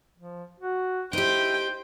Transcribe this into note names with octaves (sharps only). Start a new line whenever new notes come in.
F3
F#4
D#4 E4 G4 C5 G5